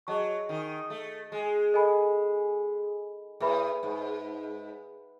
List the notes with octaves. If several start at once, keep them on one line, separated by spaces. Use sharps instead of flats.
F#3 G#4 D#5 A5 C#6
D#3
A3
G#3
A4 D#5 G#5 B5
A2 G#4 B4 E5 B5
G#2